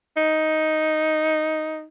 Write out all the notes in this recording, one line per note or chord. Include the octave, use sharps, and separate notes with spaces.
D#4